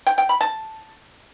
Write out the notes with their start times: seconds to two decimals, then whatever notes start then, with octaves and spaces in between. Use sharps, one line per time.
0.07 G5
0.18 G5
0.29 B5
0.41 A5